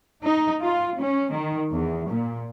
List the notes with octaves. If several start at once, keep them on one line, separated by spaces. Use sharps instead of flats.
D#4
F4
C#4
D#3
E2
A#2